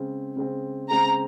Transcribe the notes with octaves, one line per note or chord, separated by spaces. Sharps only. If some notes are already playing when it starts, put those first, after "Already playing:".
Already playing: C#3 G#3 C4
C#3 G#3 C4
C#3 G#3 C4 A#5